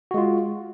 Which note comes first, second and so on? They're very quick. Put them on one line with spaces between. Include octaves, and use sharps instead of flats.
F#4 G#3 F4